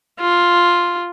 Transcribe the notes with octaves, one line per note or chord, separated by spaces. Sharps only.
F4